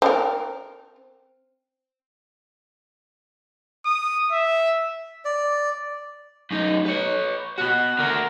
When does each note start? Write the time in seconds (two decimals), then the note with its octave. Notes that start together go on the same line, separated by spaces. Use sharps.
0.02 C4 A#4
3.86 D#6
4.32 E5
5.25 D5
6.51 F#2 D#4
6.86 B4 C#5
7.58 B2 F#4 F#5
7.99 D3 F#4 A#4